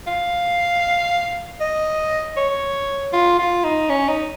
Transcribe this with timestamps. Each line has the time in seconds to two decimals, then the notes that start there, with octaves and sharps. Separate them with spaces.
0.07 F5
1.60 D#5
2.37 C#5
3.13 F4
3.39 F4
3.64 D#4
3.89 C#4
4.08 D#4